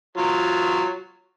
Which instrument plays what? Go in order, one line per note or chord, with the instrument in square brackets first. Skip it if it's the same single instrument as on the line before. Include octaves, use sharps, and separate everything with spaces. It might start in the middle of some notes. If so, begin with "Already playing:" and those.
[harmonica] F#3 F4